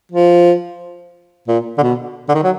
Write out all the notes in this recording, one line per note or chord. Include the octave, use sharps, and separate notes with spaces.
F3
A#2
D3
B2
D3
D#3
F#3